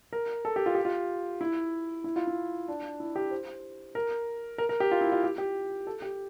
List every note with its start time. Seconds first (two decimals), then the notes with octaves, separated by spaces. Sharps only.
0.13 A#4
0.45 A4
0.56 G4
0.66 F4
0.75 G4
0.85 F4
1.41 E4
2.04 E4
2.16 F4
2.27 E4
2.68 D4
3.00 E4
3.16 G4
3.31 C5
3.95 A#4
4.58 A#4
4.69 A#4
4.80 G4
4.91 F4
5.01 E4
5.12 F4
5.23 G4
5.38 G4
5.87 A4
6.02 G4